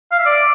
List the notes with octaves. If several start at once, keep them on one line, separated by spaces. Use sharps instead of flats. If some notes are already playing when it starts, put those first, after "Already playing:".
F5
E5
D5